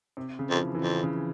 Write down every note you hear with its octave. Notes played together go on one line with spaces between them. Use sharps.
C3
C#3
F2
F3
E3
E3
F2 C#3
C#3